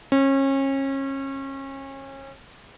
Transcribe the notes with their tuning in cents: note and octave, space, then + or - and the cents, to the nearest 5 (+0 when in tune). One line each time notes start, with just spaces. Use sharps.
C#4 -30